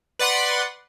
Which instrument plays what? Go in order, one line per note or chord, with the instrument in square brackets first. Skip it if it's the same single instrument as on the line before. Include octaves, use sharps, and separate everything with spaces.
[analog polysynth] B4 D5 F#5 C6